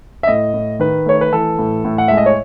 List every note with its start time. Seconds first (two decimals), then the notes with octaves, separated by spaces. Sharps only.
0.23 E5
0.27 A2 D#5
0.54 A2
0.79 D#3 B4
1.06 A3 C#5
1.21 B4
1.32 E3 A4
1.59 A2
1.85 A2
1.98 F#5
2.08 G#3 E5
2.17 D#5
2.26 C#5